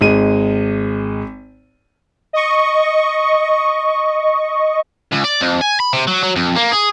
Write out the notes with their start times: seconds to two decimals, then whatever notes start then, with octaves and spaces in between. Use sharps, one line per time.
0.01 G#1 G#3 D#7
2.33 D#5 C#6
5.12 C#2
5.24 D5
5.40 F2
5.61 G#5
5.80 B5
5.93 C3
6.07 F#3
6.23 F#3
6.36 F2
6.56 A#3
6.72 G#4